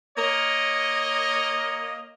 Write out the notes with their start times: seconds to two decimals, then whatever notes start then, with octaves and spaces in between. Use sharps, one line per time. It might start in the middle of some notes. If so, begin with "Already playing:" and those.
0.18 A#3 A#4 C#5 D#5